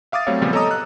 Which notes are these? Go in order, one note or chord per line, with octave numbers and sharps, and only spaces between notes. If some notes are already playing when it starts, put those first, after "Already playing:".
E5 F5 D6 D#6 A6
F#3 G3 A3 C4 C#5 F5
A#2 C#3 F3 G3 B3
A4 C#5 D#5 A#5 D6 D#6
E6 F#6